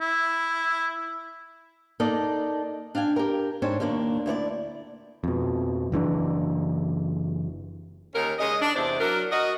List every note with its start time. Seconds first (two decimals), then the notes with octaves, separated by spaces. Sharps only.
0.01 E4
2.00 A#3 D#4 A4 D5 D#5
2.95 D4 F5 G5 G#5
3.16 G4 A#4
3.62 G#2 C4 D4 C5 C#5
3.80 D#2 A#2 A#3 C4 D4
4.26 D2 E4 C#5 D5
5.24 F2 B2
5.92 F#1 E3 C#4 D4
8.15 D#2 D#3 C#4 A#4
8.39 C#3 G#3 D#5
8.62 D4
8.76 E2 C3 D4 C5 D5
9.00 F#3 D4 A#4
9.32 F#4 A#4 D#5